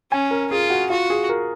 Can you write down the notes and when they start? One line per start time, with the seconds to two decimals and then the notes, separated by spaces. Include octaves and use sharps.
0.11 C#4 G#5
0.31 A#4
0.51 F4 G#4
0.70 F#4
0.90 F4 F#4
1.10 G#4
1.29 A#4